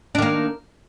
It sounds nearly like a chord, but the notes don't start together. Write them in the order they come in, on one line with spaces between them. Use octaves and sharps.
D4 D#3 A#3